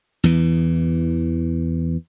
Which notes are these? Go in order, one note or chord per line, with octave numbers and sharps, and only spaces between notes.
E2 E3